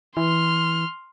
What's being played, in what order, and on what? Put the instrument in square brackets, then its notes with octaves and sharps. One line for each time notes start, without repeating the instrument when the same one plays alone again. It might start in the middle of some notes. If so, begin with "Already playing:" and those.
[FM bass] E3 [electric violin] C6 F6